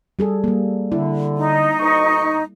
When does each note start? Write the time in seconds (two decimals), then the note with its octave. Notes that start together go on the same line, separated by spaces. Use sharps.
0.19 G3 G#4 A4
0.44 G3 A#3
0.92 D3 E4
1.37 D#4
1.80 D2 B2 C#6